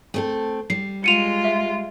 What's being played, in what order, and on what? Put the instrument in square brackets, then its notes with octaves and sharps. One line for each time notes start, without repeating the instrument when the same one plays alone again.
[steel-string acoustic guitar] A3 C4 A4
[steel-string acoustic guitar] G3 [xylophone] C7
[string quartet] G#3 F4 [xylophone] C#7 D#7 F7
[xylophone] E5